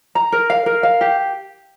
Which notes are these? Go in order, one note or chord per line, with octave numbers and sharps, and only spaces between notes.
A#5
A#4
F5
A#4
F5
G4